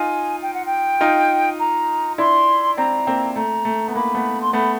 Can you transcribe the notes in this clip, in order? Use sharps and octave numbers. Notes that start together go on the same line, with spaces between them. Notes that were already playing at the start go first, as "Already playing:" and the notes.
Already playing: D#4 F4 G#5
G5
F#5
G5
D#4 F4
A#5
D4 E4 C6
C4 D4 A#5
A#3 C4
A3 A#5
A3
B3
A#5
A#3 B5
A3 B3
C6
A3 B3 B5